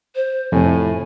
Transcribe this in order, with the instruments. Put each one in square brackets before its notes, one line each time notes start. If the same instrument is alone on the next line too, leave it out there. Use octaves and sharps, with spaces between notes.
[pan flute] C5
[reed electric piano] F2 C3 [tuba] A2 [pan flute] G#5